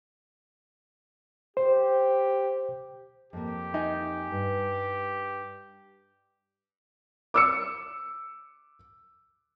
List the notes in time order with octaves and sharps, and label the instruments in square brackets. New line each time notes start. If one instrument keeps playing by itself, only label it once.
[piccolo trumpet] G4 [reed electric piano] C5
[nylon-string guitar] F2 A#3 [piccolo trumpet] G4
[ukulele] D#4 D#5 G#5
[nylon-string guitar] G2
[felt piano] D6 E6 C#7